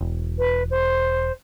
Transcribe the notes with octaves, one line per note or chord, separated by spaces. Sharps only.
E1
B4
C5